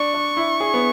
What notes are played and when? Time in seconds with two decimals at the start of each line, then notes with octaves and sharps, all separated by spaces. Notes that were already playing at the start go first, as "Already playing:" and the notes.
Already playing: D4 C#6
0.14 D4
0.37 E4
0.60 G#4
0.74 B3